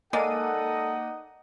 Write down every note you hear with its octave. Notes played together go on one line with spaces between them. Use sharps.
G#3 A#3 D#4 A4 D5 D#5 F#5 D#7